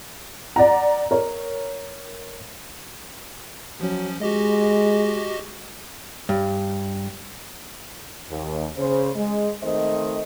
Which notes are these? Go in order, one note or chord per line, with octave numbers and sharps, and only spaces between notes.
D5 F#5 A#5
A#4 C#5
F3 F#3 C#4
G#3 F#4 G4 D#5
G2
D#2
C#3 C5
G#3
D#3 A3 C4 C5 D#5